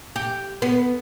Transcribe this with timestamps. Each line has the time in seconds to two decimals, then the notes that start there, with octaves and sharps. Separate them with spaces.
0.16 G4
0.62 B3